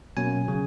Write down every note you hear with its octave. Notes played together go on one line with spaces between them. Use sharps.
B2 F#3 A#3 C#4 G#5
C#3 F#3